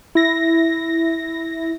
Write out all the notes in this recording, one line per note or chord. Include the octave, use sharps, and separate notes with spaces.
E4 A#6